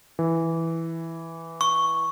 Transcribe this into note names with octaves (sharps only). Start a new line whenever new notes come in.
E3
C#6